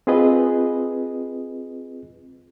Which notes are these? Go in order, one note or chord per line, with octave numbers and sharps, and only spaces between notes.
C4 F4 G#4 B4 D#5